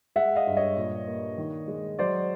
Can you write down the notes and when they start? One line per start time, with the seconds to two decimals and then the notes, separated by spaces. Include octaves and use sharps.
0.16 G#3 E5 F#5
0.36 D#5 F5
0.47 G2
0.57 C#5 D#5
0.77 A#2
1.07 A#3
1.38 D#3
1.68 G#3
1.99 F#3 C5 D5